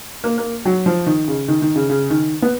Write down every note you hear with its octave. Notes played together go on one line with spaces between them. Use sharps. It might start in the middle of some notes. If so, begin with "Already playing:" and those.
A#3
A#3
F#3
F3
D#3
C#3
D#3
D#3
C#3
C#3
D#3
B3